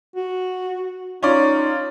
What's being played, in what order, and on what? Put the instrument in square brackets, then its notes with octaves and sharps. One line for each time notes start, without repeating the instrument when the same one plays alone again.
[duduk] F#4
[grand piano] C#4 F4 D5 [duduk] D#4